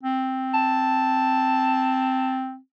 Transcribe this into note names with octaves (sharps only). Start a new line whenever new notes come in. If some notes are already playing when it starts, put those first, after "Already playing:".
C4
A5